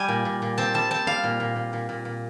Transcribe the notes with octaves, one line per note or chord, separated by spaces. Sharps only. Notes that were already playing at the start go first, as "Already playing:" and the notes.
Already playing: G3 G#5
A#2
A#2
A#2
C4 A5
G3 A5
C4 A5
G3 F5
A#2
A#2
A#2
A#2
A#2
A#2